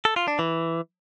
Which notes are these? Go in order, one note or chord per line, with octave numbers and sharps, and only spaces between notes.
A4
F4
D4
E3